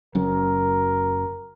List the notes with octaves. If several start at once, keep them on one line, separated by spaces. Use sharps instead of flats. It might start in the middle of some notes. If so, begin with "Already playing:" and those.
F#1 F#2 A#4